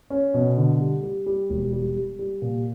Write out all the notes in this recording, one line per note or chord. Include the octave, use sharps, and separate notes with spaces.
C#4
B2
D3
G3
G3
G3
E1
G3
G3
G3
A#2